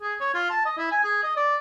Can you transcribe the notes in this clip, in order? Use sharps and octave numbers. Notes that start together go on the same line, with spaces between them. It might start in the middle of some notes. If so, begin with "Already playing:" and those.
G#4
C#5
F4
A5
D#5
E4
G#5
G#4
D#5
D5